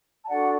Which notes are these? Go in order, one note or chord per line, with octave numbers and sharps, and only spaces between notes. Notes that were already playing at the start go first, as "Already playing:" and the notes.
A5
D4 F#4 A4 D5 F#5